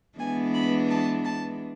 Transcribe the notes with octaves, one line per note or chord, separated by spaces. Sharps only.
E3 G#3 B3 D4 G#5
B5
A5
A5